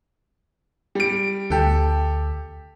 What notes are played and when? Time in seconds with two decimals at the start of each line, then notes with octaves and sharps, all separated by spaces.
0.95 G3 D7
1.50 D2 G4 A4